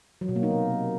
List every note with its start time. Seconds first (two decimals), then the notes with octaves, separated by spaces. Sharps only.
0.21 F#3
0.29 B2
0.36 A#3
0.43 D#4
0.50 C3